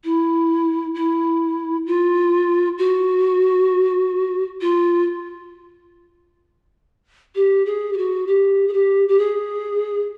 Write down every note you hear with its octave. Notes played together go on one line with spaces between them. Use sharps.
E4
E4
F4
F#4
F4
G4
G#4
G4
F#4
G4
G#4
G4
G4
G#4